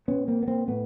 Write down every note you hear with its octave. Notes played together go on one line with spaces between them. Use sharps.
A#2 B3 C#4
A#3 C4
B3
A#3 C4
A2 A3 B3